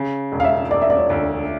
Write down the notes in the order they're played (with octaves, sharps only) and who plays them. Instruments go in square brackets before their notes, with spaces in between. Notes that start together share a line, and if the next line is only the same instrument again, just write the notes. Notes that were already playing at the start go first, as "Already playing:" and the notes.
Already playing: [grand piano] C#3
E1
[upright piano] F5
E5
[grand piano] E1 [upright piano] D5
[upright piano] E5
D5
C#5
[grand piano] D2